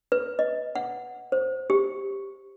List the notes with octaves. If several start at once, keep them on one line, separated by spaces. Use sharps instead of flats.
B4
D#5
F#5
C5
G4